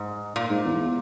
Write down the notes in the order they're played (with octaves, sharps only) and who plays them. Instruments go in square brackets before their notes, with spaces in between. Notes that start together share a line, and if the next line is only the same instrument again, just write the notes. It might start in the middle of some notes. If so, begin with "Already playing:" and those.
Already playing: [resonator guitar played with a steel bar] G#2
A#2
[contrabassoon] G#2
E2